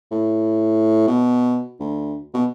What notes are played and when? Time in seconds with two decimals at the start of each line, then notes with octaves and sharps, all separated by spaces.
0.11 A2
1.08 B2
1.80 D2
2.34 B2